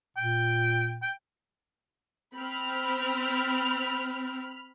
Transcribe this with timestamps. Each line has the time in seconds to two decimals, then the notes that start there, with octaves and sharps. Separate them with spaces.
0.17 A#2 G5
1.02 G5
2.36 C4 B5 F6